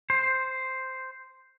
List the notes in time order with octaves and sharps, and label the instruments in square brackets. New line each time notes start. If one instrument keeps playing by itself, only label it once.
[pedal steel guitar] C5